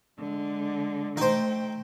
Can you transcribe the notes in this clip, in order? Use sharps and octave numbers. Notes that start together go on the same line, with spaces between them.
D3 G#3
A3 D#4 C5 G5